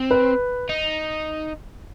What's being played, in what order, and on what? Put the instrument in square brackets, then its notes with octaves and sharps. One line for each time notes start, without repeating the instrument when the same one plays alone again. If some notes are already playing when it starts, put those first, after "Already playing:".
Already playing: [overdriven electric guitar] C4
[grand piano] B4
[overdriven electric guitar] D#4